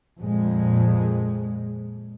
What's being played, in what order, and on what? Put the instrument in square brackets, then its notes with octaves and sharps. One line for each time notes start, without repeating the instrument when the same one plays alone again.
[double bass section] F2 A#2 G#3